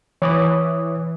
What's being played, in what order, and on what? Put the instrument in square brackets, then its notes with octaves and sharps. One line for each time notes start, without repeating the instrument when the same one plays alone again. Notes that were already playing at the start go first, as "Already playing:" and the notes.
[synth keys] E3 [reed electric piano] C#5 D6 D#6